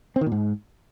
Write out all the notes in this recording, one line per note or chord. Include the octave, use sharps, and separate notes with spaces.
C4
D#3
A#2
G#2